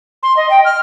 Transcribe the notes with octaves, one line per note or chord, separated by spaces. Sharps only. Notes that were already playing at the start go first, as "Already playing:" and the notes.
C6
D#5
G5
F6